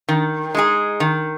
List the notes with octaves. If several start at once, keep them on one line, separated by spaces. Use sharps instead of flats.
D#3
G#3 D#4 G#4
D#3